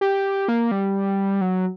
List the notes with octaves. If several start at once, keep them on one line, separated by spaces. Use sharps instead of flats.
G4
A#3
G3
F#3